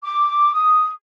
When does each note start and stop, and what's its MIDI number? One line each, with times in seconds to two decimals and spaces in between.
0.03 0.51 86
0.53 0.90 87